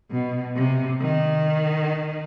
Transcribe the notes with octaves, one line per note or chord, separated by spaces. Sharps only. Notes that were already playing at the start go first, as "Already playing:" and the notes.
B2
C3
D#3